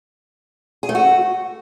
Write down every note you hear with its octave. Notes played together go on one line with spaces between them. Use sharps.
G#4
A3
F#4